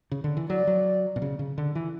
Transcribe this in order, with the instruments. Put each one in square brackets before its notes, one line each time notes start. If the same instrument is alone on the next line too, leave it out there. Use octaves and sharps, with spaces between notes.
[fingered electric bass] C#3
D3
E3
[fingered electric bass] F#3 [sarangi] D5
[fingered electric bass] F#3
B2
C#3
C#3
D3
E3